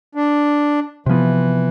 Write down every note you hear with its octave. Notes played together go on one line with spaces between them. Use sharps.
D4
C3 E3 F3 B3